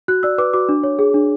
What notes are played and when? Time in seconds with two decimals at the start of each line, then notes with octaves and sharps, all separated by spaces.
0.08 F#4 F#6
0.23 D5 E6
0.38 B4 D6
0.53 F#4 D6
0.69 D4
0.84 C#5
0.99 G#4
1.14 D4